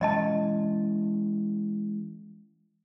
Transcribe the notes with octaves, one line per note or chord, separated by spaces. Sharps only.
E3 G#3 C#4 D5 D#5 A5